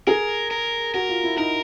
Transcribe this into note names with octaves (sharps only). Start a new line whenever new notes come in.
G#4 A#4
A#4
F#4 A#4
F4
E4
D#4 A#4